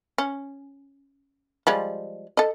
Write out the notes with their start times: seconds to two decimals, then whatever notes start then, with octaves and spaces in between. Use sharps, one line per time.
0.18 C#4
1.67 F3 G3 G#3
2.37 A4 D#5